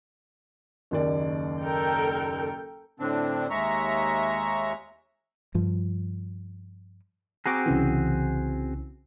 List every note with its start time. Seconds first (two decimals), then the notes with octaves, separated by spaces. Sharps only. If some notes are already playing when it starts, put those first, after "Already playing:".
0.91 F#1 D#2 D5
1.61 A4 A#4 G5
3.00 A2 D3 C4 D4
3.50 D#2 G#3 E5 A#5 C#6
5.55 G2 F3
7.46 C4 F#4 G#4 A#5 C#6 D6
7.66 C2 C#3 E3